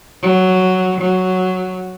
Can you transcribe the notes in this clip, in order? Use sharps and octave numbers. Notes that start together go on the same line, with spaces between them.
F#3
F#3